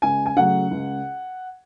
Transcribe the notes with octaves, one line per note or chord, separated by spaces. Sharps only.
C#2 G#5
G#5
C#3 F#3 A3 F#5
C#2